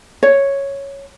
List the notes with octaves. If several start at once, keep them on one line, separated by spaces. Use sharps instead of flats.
C#5